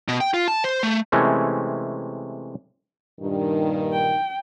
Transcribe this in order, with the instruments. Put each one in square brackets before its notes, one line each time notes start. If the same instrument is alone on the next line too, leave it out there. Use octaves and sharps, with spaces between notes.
[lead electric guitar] B2
G5
F4
A5
C5
A3
[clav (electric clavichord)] C3 E3 G#3 A3 C#4
[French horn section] G2 A#2 D#3
[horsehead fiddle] G5